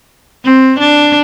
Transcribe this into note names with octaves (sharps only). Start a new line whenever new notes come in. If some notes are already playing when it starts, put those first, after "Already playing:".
C4
D4